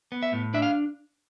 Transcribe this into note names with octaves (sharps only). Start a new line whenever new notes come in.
B3
E5
A2
D4 E5
F5